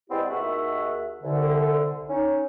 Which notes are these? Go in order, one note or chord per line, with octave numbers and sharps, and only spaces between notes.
G#3 B3 C4 E4 G4 D5
D#2 D#3 F#4 G#4 E5
C2 D3
C#4 D#4